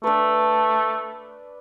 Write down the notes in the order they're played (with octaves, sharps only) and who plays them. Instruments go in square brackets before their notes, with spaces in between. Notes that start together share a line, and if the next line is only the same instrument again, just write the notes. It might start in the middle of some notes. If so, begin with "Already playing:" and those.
[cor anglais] A3 [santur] D4 B4